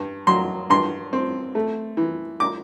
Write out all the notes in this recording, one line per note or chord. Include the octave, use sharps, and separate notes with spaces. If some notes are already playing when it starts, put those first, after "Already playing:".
Already playing: G2
F#3 C6
G2 C6
C4
A3
E3
D6